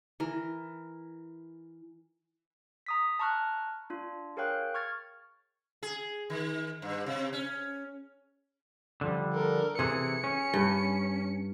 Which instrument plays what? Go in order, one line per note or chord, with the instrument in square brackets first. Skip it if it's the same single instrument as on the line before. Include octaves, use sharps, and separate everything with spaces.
[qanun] E3 A#4
[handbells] A#5 D#6 B6
A5 A#5 C#6 F6 F#6
D4 F4
G#4 A#4 C#5 F5 G5 F#6
C#6 F6 G#6 A6
[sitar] G#4
D#3
G2
C3
C#4
[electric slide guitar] D3 F3 G3
[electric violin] A4 A#4
[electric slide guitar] C3 E3 [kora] G#4 [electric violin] C#7
[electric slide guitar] C#4
[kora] G2